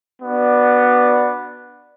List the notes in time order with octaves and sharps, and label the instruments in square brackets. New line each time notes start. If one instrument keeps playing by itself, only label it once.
[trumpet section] B3 D4 F#4 D5